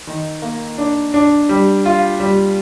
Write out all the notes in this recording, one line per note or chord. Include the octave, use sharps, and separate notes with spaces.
D#3
A#3
D4
D4
G3
F4
G3